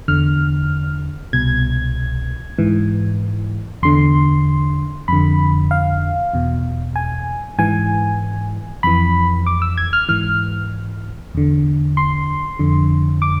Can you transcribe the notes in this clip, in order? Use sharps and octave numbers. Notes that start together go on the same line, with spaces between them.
E2 D3 F6
C2 B2 G#6
G#2 E3
E2 D3 C6
F2 D3 B5
F5
E2 B2
G#5
G#2 E3 G#5
F2 E3 B5
D6
E6
G#6
F6
G#2 E3 F6
E2 D3
C6
F2 D3
D6